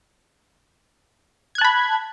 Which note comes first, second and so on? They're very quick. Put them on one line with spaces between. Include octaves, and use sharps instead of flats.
G#6 F#6 A5 B5